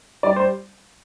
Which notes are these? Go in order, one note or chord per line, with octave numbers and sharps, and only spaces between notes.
G3 D5
C5